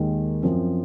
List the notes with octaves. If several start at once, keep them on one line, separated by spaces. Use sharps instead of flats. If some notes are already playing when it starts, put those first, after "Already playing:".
Already playing: D#2 D#3 G#3
F#2 F3 C4